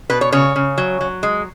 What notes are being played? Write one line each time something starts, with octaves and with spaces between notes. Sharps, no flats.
B2 B4
C#5
C#3 C#5
C#3
F#3
F#3
G#3